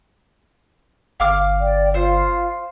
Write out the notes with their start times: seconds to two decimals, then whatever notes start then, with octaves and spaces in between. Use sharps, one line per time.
1.20 G1 F5 D6 F6
1.60 D5 G5
1.94 F4 C5 F5